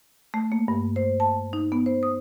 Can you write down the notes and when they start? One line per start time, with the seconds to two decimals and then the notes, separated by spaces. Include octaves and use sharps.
0.34 A3
0.52 A#3
0.68 G2
0.96 C5
1.20 A5
1.53 D#4
1.72 B3
1.86 C5
2.03 D#6